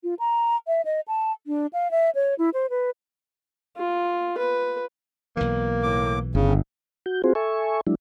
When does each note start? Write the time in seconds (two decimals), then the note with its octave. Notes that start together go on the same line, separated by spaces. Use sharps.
0.04 F4
0.19 A#5
0.67 E5
0.85 D#5
1.08 A5
1.47 D4
1.73 F5
1.91 E5
2.15 C#5
2.39 E4
2.54 C5
2.70 B4
3.77 F4
4.38 B4
5.37 B1 E3 A#3
5.83 A2 D6
6.35 G1 C#3
7.06 F#4 G6
7.24 C4 F4 F#4 G#4 C5
7.35 A4 E5 G#5 C#6
7.87 F#3 G#3 D4 E4